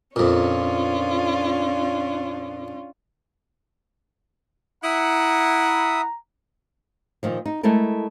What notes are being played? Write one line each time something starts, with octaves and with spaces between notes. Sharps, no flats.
F2 A#2 C#4 D4 F4
E4 E5 F#5 A#5 D#6
A#2 D#3 F3
D#4
G#3 A3 E4 A4 A#4